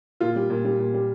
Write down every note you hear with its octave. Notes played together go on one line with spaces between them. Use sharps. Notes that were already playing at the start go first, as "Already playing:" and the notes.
A#2 F4
G3
A#2
G3
A#2
G3